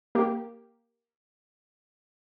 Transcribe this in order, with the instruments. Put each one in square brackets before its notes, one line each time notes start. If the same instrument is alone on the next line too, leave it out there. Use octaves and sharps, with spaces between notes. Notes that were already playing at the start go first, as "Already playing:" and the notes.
[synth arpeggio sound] A#3 G4